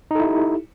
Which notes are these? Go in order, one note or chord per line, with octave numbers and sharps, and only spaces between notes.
D#4 E4 G4 A4